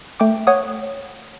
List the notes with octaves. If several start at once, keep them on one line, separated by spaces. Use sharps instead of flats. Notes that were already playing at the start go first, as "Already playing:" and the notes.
A3 G5 D6
C#5 F#5 D#6